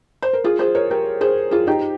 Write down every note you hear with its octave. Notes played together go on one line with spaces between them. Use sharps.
C5
A#4
F4 G#4
G#4 C5
A#4 C#5
G4 A#4
G#4 C5
F4 G#4
D#4 G4